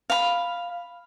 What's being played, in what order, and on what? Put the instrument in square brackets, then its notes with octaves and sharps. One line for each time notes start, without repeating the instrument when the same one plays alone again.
[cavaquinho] F5 B5